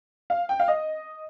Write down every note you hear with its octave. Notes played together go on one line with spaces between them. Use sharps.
F5
G5
F5
D#5